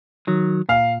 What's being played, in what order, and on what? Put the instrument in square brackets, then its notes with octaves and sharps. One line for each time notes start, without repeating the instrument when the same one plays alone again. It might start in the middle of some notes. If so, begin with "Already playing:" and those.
[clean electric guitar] D#3 F#3
[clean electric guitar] A#2 [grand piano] F5